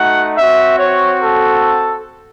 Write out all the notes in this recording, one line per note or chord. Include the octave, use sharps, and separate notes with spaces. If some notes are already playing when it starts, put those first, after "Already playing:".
Already playing: A3 D#4 F#4 F#5
C4 F#4 E5
C#5
A4